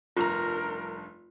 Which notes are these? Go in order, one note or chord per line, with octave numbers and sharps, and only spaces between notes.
F1 G2 F4 A#4 A#5